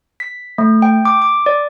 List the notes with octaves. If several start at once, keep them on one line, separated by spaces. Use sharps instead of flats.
B6
A3
G5
D6
D6
D5